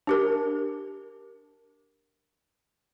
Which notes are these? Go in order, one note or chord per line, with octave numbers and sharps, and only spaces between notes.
D4 G4 A#4